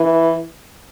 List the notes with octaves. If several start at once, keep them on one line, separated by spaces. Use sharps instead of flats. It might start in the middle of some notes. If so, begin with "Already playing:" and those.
Already playing: E3